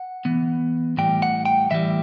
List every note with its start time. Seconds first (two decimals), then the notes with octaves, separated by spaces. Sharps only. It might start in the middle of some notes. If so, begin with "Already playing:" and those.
Already playing: F#5
0.25 E3 B3
0.97 A2 E3 G3 G5
1.22 F#5
1.45 G5
1.70 A2 E3 G3 E5